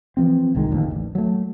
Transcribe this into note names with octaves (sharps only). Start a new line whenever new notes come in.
E3 F3 C4
D#1 C2 D#3 G#3
A1 D#2 D3 F3
A1
F#3 A3